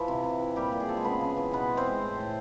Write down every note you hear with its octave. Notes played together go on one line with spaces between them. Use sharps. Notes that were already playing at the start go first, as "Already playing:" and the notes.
Already playing: E3 F3 E4
C3
C3
E3
A#2 G3 G4
A#2
G#4
F3 A4
G#3 G#4
C#3 B3 B4
C#3
E3
B2 B3 B4
G#3
C4 C5
G#3
A2
A2